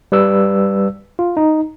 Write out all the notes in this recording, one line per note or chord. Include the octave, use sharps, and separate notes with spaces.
G3 B4 E6
F4
D#4